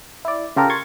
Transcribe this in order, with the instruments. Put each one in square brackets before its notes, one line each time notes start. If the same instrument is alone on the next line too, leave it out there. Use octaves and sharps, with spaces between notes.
[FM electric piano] E4 D5
C#3 F4 G4 A4 A#4
C6 C#6 G#6 A6